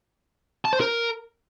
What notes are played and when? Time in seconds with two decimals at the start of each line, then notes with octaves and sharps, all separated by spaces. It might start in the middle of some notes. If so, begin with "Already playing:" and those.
0.65 A5
0.73 C5
0.80 A#4